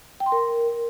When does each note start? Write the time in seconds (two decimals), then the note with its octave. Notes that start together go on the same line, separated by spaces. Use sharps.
0.20 G5
0.26 C6
0.32 A#4